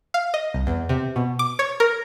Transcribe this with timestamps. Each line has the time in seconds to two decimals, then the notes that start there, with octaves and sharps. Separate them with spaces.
0.14 F5
0.34 D#5
0.54 C2
0.67 E2
0.89 C3
1.16 B2
1.39 D6
1.59 C#5
1.80 A#4